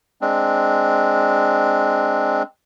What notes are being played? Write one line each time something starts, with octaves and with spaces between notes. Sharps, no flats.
G#3 C4 D4